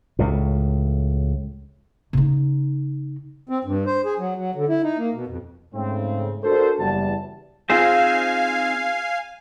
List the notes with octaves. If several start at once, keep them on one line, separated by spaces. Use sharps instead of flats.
C#2 A2
C#3 D#4
C4
G2
C5
G#4
F#3
F#3
D3
E4
D#4
A#3
B2
F2
G#2 C#3 A3 C4
D4 F#4 A4 A#4 C5
F#1 E2 G3 A5
C4 D#4 F4 G#4 C5 F5 G#5